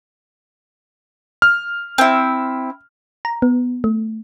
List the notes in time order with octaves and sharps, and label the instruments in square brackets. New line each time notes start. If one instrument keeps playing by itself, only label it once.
[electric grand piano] F6
[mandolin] C4 E4
[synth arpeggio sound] A#5
B3
A3